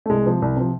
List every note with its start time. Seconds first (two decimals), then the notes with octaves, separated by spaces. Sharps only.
0.06 A3
0.10 C2 G#3
0.26 C3 F3
0.42 C2
0.57 C3 F3